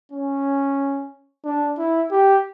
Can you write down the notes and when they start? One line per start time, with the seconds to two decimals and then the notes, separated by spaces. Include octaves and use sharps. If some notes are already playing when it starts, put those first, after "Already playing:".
0.12 C#4
1.45 D4
1.78 E4
2.11 G4